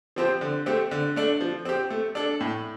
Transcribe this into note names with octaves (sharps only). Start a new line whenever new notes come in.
F3 C4 G4 C5
D3
A3 C4 G4
D3
A3 D4
F3
C4 G4
A3
D4 A4
A2